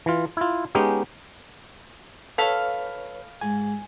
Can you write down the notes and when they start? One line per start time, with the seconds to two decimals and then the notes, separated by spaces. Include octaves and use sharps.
0.06 E3 F4
0.37 E4 F4
0.75 G#3 B3 C#4 D#4 G4
2.38 D#4 A4 B4 C#5 F5 B5
3.41 G#2 G#5